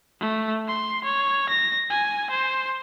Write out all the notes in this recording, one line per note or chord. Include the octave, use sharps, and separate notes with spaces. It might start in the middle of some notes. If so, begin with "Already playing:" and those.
A3
C6
C#5
A#6
G#5
C5